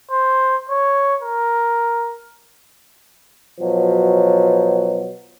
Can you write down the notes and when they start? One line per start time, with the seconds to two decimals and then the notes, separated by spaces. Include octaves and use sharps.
0.11 C5
0.70 C#5
1.22 A#4
3.61 B2 F3 F#3